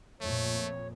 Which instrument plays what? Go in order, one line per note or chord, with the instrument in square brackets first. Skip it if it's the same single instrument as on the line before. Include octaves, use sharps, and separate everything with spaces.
[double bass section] F2 A#2 [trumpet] A3 [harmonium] C#5